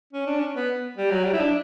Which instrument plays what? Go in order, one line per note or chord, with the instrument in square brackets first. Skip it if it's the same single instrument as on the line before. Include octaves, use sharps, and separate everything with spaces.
[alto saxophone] C#4
D4
C#4
B3
G3
F#3
G3
E4
D4